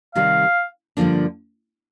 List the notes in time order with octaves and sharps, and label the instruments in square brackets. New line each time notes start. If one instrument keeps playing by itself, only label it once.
[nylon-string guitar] C3 D#3 G3 [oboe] F5
[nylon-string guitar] G2 D3 F3 A#3 D4